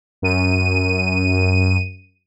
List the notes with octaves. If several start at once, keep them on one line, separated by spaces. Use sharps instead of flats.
F#2 D#7